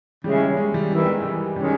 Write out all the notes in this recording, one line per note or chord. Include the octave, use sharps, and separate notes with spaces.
C#3 G3 G#3 C#4 E4
G3
G#3
G3
D#3 E3 G3 B3 E4
G#3
G3
D#3 G3 G#3 C#4